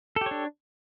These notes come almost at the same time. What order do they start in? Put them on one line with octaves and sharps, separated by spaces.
A4 G4 C#5 D4